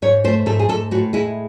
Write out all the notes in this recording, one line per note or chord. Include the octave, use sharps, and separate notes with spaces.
G#2 C#5
A3 C5
G#2 A4
G#4
G#2 A4
A2 F#4
G#3 E4